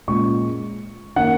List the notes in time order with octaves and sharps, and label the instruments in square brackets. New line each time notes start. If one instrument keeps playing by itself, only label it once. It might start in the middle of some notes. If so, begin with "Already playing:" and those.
[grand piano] A#2 G#3 C#4 C#6
D#3 A#3 C#4 F#5